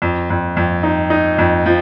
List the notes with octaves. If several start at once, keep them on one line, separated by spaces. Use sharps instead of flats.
F2
F2
F2
D#4
D#4
F2
F3